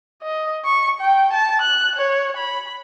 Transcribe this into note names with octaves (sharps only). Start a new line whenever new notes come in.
D#5
C#6
G5
A5
F#6
C#5
B5